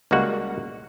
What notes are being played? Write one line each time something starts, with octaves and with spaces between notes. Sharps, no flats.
C#2 G3 G#3 A#3 F#4 F#5